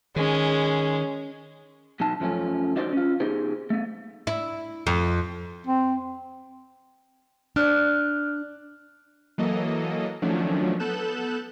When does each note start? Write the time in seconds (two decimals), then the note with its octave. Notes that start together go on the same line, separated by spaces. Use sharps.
0.16 D#3 G#3 C#4
2.00 B2 F#3 D#4 A5
2.20 F#2 F3 A3 C#4
2.76 D4 D#4 F#4 C5 D5
2.93 C#4 F4
3.20 B3 D#4 G4 G#4 C5
3.70 A3 B3
4.27 E4
4.87 F2
5.67 C4
7.56 D4 D5 F6 F#6
9.38 E3 F#3 A#3 A4 D#5
10.22 D#3 F3 F#3 A3 C#4 D4
10.79 B3 A4 F#6 G6 E7